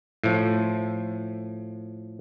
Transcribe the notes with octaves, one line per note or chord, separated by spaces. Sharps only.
A2 F3